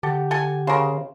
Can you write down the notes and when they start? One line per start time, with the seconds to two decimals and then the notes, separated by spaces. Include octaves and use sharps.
0.03 D3 G4 A4 F#5
0.31 A4 G#5
0.67 C#3 A#4 C5